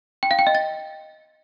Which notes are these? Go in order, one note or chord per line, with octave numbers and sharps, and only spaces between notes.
G5
F5
G5
D#5
A6